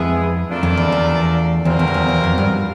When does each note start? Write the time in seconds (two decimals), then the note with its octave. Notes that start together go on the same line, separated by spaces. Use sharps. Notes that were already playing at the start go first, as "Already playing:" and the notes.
Already playing: F2 G#3 B3 E4 G#4
0.49 A3 D4 F4 A#4 D5
0.63 F2
0.77 E2
0.92 E2
1.65 E2 B2 G3 C4 F4 A#4
1.79 E2
1.88 F2
1.94 E2
2.09 E2
2.24 F2
2.38 G2